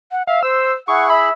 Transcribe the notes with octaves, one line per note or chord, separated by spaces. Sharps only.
F#5
E5 F5
C5 E6
E4 G#4 F#5 C#6
E5 B5